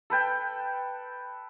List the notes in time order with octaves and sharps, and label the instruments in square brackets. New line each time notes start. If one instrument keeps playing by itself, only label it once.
[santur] A4 B4 G5 A5